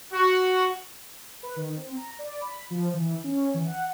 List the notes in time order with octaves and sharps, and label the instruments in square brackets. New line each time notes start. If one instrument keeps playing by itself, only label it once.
[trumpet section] F#4
[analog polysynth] B4
D#3
C4
A#5
D5
B5
F3
E3
C#4
E3
F#5